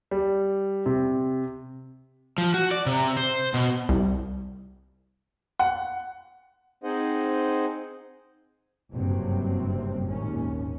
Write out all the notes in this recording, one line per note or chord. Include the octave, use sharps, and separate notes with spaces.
G3
C3
F3
F#4
D5
C3
C5
B2
C2
F#5
C4 D#4 G#4 C5 D#5 F#5
F#1 G2 C3 F#3 C4
G#1 D#2 A#2 C#4